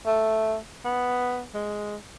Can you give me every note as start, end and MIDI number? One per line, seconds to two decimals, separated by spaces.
0.06 0.57 57
0.84 1.45 59
1.54 1.96 56